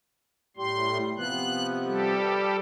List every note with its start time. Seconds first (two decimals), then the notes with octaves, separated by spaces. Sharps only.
0.57 A2 G3 C6
1.18 C3 F3 B3 F#6
1.85 G3 G4 A4